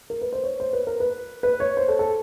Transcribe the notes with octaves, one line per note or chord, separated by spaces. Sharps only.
A#4
B4
C5
C#5
C5
B4
A#4
B4
B4
C#5
C5
A4
A4